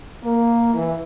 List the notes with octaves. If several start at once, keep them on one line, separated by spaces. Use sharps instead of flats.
A#3
E3